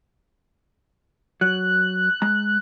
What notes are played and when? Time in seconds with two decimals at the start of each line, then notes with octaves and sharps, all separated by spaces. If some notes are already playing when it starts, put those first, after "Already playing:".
1.41 F#3 F#6
2.22 G#3 A#5